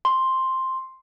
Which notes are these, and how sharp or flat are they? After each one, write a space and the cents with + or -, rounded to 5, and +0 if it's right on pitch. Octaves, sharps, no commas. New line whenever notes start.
C6 +5